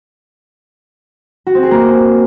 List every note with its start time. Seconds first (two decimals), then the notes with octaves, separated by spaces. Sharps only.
1.47 F#4
1.55 C4
1.63 G#4
1.71 A#3